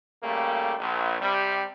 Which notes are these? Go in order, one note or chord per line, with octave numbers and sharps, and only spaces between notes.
C#3 G3 A3 A#3
A#1
C3 G3